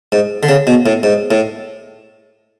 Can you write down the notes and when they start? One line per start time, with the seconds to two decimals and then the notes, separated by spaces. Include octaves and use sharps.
0.12 G#2
0.43 D3
0.49 C#3
0.67 B2
0.86 A2
1.03 G#2
1.31 A2